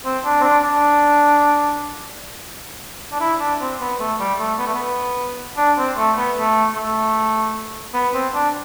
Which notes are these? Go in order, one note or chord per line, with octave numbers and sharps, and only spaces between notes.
C4
D4
C4
D4
D4
D4
E4
D4
C4
B3
A3
G3
A3
B3
A3
B3
D4
C4
A3
B3
A3
A3
B3
C4
D4